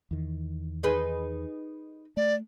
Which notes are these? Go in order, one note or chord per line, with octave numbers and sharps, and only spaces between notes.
E2 D#3
D#4 G#4 B4
A3 D5